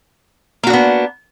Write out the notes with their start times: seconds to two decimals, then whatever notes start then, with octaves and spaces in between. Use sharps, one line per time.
0.63 A#3
0.67 F#4
0.70 D4
0.73 B3